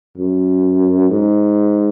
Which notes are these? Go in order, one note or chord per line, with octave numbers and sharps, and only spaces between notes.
F#2
G#2